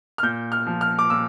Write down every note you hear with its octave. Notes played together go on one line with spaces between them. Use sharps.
F6
A#2 G6
F6
F3
F6
D6
A#2 E6